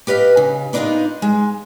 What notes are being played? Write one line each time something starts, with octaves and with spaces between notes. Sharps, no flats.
G4 B4 D#5 F5
C#3
B3 D4 D#4 F4 A#4 B4
G#3